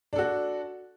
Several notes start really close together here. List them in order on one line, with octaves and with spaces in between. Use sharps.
D4 A4 F#4